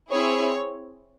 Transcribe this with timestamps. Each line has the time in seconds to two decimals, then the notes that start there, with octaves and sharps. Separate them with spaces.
0.11 C4 E4 G#4 C#5